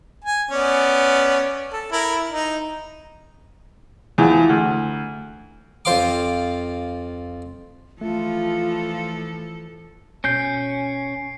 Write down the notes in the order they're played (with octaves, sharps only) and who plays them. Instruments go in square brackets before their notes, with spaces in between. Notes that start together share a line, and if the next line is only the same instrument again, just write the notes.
[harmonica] G#5
B3 C#4 D5
A4
E4 A#4
D#4
[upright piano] E2 E3 F3
D2
[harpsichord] F2 F4 C5 F5 C6 D6
[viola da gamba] E3 F3 A4 [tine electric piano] A3 [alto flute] F4
[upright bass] B2 [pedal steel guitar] C#4 G6 [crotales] C7 D7